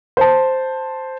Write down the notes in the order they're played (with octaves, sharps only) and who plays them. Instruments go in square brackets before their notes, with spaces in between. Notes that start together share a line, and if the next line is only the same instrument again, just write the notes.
[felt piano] C5 A5